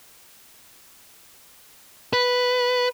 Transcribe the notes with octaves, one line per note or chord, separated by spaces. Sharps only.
B4